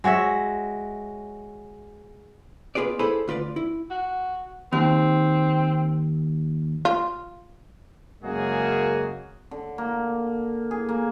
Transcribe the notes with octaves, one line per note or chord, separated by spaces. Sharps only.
G#3 F#4 C#5 E5
B3 F4 G#4 B4 D5
E4 G#4 A4 B4 C5 D5
D2 F4 B4 D5
E4
F#4
D#2 C4
F4
F#2 C#3 G#3 A#3 F#4 G#4
D3
A#3
G#4
A#3